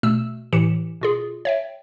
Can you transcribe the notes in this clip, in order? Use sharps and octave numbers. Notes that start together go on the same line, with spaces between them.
B2 A3 E6 E7
A2 E3 G4 C#7 E7
B2 F4 G#4
C#5 E5 G5